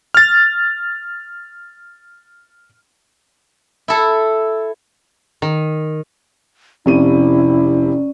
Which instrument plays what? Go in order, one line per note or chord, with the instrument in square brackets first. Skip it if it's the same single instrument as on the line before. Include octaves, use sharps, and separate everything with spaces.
[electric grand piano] F6 A6
[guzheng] E4 A4
[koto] D#3
[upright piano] F1 C3 D#7 [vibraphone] C#4 D5 [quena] E4